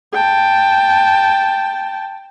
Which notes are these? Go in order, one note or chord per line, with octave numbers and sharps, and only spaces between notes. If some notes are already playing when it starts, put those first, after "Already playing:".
G5 A5